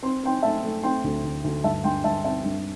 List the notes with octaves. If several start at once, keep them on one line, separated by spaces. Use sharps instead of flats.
C4 C6
C4 G5 C6
A3 E5 A5
A3
C4 G5 C6
D2
D3
D2
G2 E5 A5
G2 G5 C6
G2 E5 A5
C4 E5 A5
G2